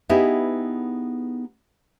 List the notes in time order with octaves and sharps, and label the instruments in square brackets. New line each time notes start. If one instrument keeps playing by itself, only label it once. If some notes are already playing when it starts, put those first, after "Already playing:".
[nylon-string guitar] B3 D#4 E4 G4 G#4